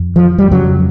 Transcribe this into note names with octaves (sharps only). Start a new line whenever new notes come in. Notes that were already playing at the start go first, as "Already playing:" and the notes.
Already playing: F2
F3
G3
F2 C#3 F#3